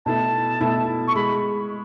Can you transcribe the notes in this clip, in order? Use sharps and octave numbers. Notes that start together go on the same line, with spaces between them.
B2 A3 E4 A5
B2 A3 E4
C#6
G#3 B5